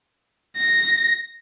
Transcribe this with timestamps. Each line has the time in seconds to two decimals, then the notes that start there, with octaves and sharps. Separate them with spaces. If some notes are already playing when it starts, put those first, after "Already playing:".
0.56 A#6